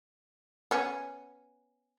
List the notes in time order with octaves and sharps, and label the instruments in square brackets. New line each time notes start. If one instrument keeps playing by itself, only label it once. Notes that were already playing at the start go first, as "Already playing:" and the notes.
[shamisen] B3 C#4